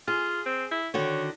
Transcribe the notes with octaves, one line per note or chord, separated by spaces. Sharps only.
F4 G#4
C4
E4
D3 D#3 F#4 C#5